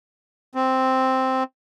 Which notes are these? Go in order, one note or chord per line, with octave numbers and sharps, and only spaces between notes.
C4